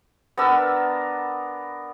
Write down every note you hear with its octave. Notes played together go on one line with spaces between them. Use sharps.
B3 D4 A#4 E6